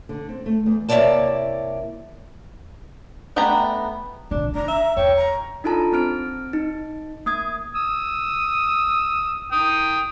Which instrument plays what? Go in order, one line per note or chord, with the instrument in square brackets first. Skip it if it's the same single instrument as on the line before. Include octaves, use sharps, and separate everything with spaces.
[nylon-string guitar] D3
C4
A3
E2
[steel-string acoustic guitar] C3 A#3 E4 C#5 D5 A5
[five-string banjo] A3 B3 D4 G5 A#5
[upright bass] A#1 D3 [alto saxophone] D4
[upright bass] D#3 [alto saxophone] D4 [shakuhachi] A#5
[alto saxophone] E5
[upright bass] E2 [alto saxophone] C#5 [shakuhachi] G5
[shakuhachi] A#5
[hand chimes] D4 D#4 F4 A4 A5 A#5
C4 F6 D7
D#4
A#3 D#6 G#6
[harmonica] D#6 E6
G5 D#6